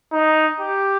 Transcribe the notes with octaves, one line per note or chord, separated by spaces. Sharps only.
D#4
G4